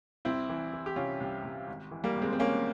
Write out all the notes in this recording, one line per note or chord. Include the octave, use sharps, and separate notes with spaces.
C2 C4 E4
E3
E3
G4
C3 C#4 F4
C2
C2
G#1
E3
G3 A#3
G#1
G#3 C4
C4
G#1 A#3 C#4